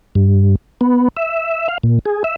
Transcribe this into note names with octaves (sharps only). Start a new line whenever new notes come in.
G2
B3
E5
F5
A#2
G#4
E5